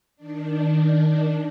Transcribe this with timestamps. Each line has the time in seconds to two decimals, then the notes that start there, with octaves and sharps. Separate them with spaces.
0.16 D#3 D4